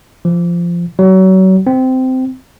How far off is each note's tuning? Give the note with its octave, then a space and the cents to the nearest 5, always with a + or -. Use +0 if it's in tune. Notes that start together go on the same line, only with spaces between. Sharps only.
F3 -15
F#3 +30
C4 -15